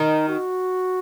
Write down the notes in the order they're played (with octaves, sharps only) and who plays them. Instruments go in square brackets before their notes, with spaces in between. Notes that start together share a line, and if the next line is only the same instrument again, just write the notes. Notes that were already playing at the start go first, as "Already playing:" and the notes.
Already playing: [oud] D#3 [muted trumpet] D#4
[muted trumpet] F#4